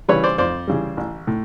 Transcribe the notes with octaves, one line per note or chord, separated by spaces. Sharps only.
C#3 E3 G3 B4 C#5
C5 D5
F2 C5 D5
C#3 E3 G3
A1
A2